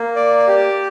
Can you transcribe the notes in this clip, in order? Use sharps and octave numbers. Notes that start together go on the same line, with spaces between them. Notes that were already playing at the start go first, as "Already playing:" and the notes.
Already playing: A#3
D5
G4